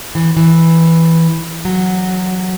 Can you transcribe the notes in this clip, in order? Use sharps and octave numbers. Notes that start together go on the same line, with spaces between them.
E3
E3
F#3